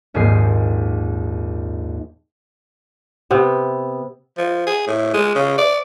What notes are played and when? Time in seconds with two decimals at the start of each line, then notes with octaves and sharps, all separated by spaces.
0.14 A#1 D#2 G#2 C4 G#4 C7
3.31 C3 B3
4.38 F3
4.67 G#4
4.87 A2
5.14 G#3
5.35 C#3
5.58 D5